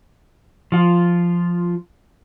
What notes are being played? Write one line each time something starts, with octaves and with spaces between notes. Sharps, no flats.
F3 F4